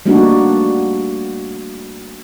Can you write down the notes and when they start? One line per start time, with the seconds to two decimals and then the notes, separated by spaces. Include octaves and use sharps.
0.06 G3 A3 A#3 D4 D#4 F#4